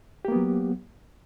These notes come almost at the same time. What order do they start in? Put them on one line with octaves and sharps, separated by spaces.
G4 A#3 B3 F#3